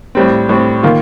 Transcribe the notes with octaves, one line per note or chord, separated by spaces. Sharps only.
A2 G3 C4
A2 G3 C4
D#3 A#3 F4